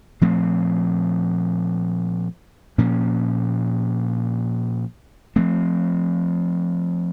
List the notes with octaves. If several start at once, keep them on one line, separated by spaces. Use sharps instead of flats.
A#2 F3 A3 C4
A#2 F3 A#3 C#4
F3 A3 C4